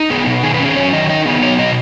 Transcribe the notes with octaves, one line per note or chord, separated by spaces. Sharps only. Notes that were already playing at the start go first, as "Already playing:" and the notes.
Already playing: D#4
B3 G#4
B2
D#3 G#4
B4
C#4
G#4
F#3 C#5
D#3 D#5
D#4 D#5
B3 G#4
F#3 C#5
B2 D#5